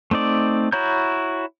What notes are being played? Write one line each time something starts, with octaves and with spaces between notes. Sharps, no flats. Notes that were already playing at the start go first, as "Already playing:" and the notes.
A3 C4 D#4 D5
E4 F#4 C#5 A#5 G6